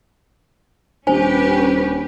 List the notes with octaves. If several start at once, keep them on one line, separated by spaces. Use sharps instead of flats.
D#1 C#4 D4 G4 B4 C5 G#5